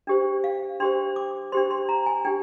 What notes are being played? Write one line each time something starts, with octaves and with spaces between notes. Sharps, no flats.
D4 G4 C5
F5
D4 G4 C5 C6
D6
D4 G4 C5 C6
C6
A#5
G#5
D4 G4 G5